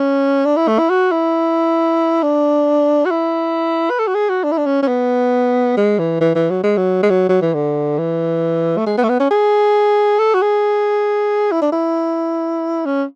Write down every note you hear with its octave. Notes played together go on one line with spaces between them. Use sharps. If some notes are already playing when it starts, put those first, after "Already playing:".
Already playing: C#4
D4
E4
A3
E4
F#4
E4
D4
F#4
E4
B4
A4
F#4
G#4
F#4
D4
E4
D4
C#4
C#4
B3
G#3
E3
E3
E3
F#3
G#3
F#3
G#3
F#3
F#3
E3
D3
E3
A3
G#3
B3
A3
B3
C#4
G#4
A4
F#4
G#4
E4
D4
E4
C#4